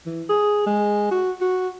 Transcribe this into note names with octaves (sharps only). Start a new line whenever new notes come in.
E3
G#4
G#3
F#4
F#4